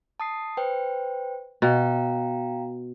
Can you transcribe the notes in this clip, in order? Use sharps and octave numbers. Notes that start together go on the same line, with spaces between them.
A5 D#6 C7
B4 C5 G5
B2 F5 G5 A#5